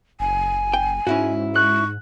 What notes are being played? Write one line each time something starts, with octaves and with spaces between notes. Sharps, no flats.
F#1 G#5
G5
G#2 C#4 E4 F#4
C#6 F#6